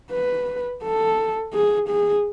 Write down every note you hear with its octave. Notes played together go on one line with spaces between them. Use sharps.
B4
A4
G#4
G#4